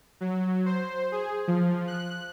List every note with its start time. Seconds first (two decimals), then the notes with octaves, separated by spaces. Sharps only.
0.21 F#3
0.66 C5
1.12 G#4
1.48 F3
1.87 F#6